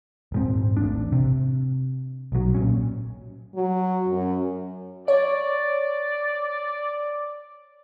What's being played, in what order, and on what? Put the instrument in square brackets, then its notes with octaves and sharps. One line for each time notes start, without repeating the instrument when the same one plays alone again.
[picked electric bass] D#1 G#2 C4
A1 D4
C3
B1 F#3
A#2 C#4
[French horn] F#3
F#2
[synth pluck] C#5 [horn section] D5